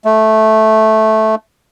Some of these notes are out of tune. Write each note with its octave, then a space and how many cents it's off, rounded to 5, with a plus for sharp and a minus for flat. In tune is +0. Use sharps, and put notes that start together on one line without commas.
A3 -10